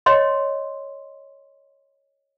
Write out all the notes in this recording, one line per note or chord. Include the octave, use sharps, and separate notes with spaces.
C#5 D#5 C6